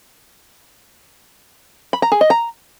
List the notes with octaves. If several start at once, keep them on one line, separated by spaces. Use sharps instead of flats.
B5
A#5
G#4
D#5
A#5